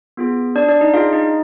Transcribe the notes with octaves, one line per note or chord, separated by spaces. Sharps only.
B3 F4 G#4
D4 D5
D4 D5
D#4 D#5
D4 F4 G#4 F5
D#4 D#5